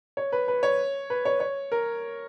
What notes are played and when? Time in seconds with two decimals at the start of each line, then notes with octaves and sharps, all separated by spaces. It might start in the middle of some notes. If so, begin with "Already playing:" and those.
0.17 C#5
0.32 B4
0.48 B4
0.63 C#5
1.10 B4
1.25 C#5
1.40 C#5
1.72 A#4